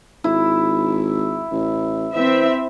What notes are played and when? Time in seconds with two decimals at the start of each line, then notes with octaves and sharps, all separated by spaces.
0.24 G#1 E4
1.51 A1
2.15 E3 C4 E5